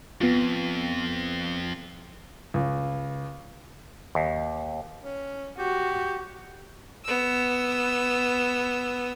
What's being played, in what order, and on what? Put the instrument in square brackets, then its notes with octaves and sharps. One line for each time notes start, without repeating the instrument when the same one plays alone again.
[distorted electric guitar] F2 [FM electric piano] B3 F4
[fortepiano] C#2
[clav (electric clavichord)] D#2
[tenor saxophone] C#4
[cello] F#4 [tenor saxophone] G4
[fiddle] B3 E6